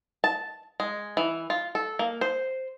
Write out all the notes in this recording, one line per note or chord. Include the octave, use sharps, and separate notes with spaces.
A5
G#3
E3
F4
A4
A#3
C5